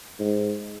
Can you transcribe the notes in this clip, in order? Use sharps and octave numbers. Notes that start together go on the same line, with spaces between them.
G#2